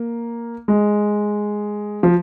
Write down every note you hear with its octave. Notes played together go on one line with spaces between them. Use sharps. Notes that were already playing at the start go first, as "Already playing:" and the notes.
Already playing: A#3
G#3
F3